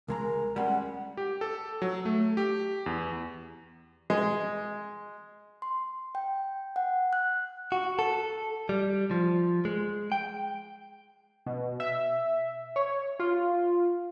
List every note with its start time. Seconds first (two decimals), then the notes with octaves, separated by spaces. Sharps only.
0.08 C#2 G#3 A#4 A#5
0.56 G3 G#3 C#4 F#5
1.17 G4
1.41 A4
1.82 F#3
2.05 A3
2.37 G4
2.86 E2
4.10 G#3
5.62 C6
6.15 G5
6.76 F#5
7.13 F#6
7.72 F#4
7.99 A4
8.69 G3
9.11 F3
9.65 G#3
10.12 G5
11.46 B2
11.80 E5
12.76 C#5
13.20 F4